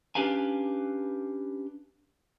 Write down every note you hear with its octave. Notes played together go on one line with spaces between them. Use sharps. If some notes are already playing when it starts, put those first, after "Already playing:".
C#4 D4 G4 B4 F5 G#5